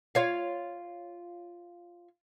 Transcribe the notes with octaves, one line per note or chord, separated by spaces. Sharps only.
F4 C#5 F5